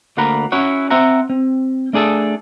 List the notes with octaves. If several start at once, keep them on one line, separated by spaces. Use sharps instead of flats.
D2 A#3 F#5 A#5 B5
C#4 E4 F#4 C#5 F#5
C4 C5 E5 F#5 A#5
C4
A3 D4 G#4 A4 A5